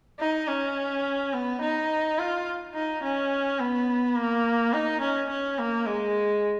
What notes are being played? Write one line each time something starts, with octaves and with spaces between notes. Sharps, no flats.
D#4
C#4
B3
D#4
F4
D#4
C#4
B3
A#3
D#4
C#4
C#4
A#3
G#3